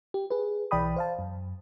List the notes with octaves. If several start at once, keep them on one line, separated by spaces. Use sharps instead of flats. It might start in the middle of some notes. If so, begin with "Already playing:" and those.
G4
G#4 B4
B1 E3 D5 G5 B5 D#6
C5 F5 A5
F#2